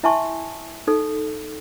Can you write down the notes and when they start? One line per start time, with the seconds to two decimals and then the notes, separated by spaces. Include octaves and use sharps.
0.03 E4 E5 G#5 A5 C6 C#6
0.87 D#4 A4